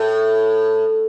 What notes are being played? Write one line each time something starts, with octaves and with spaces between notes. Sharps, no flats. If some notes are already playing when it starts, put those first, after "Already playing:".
Already playing: A2